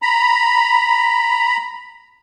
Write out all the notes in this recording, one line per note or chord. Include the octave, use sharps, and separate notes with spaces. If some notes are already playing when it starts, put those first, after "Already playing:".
A#5 B5